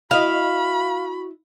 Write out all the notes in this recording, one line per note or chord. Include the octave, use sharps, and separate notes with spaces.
E4 F#4 D#5 F5 B5